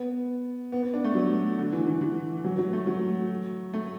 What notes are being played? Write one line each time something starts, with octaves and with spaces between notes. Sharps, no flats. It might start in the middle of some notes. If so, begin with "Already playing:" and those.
Already playing: B3
B3
B3
D4
A3
F#3
D3
E3
E3
E3
F#3
F#3
A3
F#3
A3